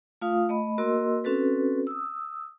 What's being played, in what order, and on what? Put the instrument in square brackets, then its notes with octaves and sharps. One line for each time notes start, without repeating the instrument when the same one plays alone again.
[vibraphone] A3 F4 F5 D#6
A3 D#5 B5
A#3 F#4 A#4 D#5 C6 E6
C4 C#4 F#4 A4 B4
D#6 E6